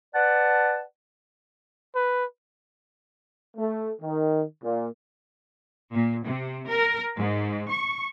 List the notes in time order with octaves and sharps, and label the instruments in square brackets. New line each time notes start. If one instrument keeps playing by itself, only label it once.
[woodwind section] B4 D5 F#5 A5
[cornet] B4
[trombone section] A3
D#3
A#2
[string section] A#2
C3
A#4
G#2
C#6